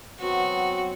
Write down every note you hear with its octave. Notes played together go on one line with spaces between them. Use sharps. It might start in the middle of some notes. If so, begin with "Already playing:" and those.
F#3 B3 C4 F#4